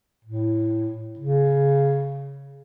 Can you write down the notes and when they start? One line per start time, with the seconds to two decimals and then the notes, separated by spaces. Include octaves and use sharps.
0.24 A2
1.19 C#3